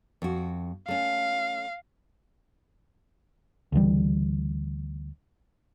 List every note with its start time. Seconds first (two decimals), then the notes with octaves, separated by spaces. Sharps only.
0.22 F2 F#4
0.88 A3 C#4 F5
3.72 D2 C#3 E3 G3